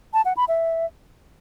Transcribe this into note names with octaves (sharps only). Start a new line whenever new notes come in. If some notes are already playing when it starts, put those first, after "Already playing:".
A5
F#5
B5
E5